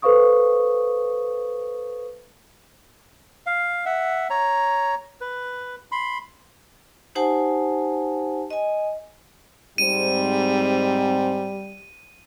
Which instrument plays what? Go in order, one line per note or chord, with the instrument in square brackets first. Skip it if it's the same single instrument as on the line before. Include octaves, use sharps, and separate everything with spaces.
[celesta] A4 B4 C5 F5 C#6 D#6
[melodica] F5
E5 F#5
C#5 A#5
B4
B5 C6
[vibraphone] D#4 G4 C5 F#5 G#5 A5
D#5 G#5
[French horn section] G#2 C4 [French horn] G3 [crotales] D#7